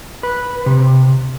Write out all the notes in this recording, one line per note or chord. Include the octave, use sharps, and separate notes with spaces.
B4
C3